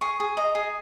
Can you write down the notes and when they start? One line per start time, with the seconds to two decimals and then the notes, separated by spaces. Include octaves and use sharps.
0.01 G#4 C#6
0.20 G#4
0.37 D#5 A#5
0.55 G#4